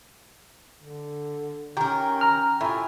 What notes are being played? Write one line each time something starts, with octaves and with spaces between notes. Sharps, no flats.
D3
D#3 C#4 G4 A#4
A#5 F6
A2 E4 F4 G#5